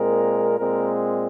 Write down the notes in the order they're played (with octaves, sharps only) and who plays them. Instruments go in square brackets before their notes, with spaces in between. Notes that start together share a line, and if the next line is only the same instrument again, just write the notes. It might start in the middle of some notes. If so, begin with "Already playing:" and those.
Already playing: [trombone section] A#2 G#3 C4 A#4
A#2 G#3 C4 A#4